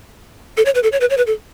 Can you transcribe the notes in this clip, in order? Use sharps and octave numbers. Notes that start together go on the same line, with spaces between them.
A4
C#5
B4
A4
C#5
B4
C#5
B4
A4